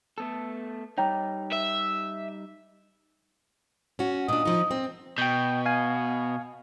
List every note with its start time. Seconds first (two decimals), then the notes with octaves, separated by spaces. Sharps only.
0.18 A3 B3 A4
0.98 G3 D#4 C#5 G5 A#5
1.53 E5
3.99 C#4 F#4
4.28 A#2 D4 D#5
4.45 F3 D#4
4.71 C4
5.18 B2 G5 G6
5.66 F5 G#5